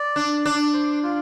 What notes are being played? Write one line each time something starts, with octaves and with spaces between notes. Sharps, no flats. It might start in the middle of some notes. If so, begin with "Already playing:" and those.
Already playing: D5
D4
D4
C5
F4